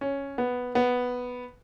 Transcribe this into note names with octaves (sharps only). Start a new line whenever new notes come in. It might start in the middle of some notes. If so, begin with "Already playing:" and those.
C#4
B3
B3